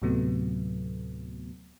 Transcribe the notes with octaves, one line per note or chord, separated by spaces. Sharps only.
D2 A2 C3 F#3 A3 B3